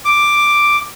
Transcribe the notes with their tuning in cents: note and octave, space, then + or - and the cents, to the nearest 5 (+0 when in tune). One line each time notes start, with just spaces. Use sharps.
D6 +5